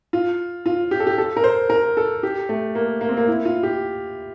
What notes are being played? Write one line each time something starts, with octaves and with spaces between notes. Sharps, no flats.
F4
F4
G4
A4
G4
A4
A#4
C5
A#4
A4
G4
A3
A#3
A#3
C4
A#3
E4
F4
G4